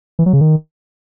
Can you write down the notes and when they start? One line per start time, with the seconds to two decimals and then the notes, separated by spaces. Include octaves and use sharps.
0.19 E3
0.26 F#3
0.33 C#3
0.41 D#3